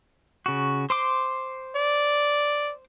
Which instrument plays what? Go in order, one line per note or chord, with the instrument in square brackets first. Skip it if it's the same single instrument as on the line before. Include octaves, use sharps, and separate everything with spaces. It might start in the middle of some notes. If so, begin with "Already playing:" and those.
[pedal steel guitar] C#3 F#4
C5 C6 D6
[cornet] D5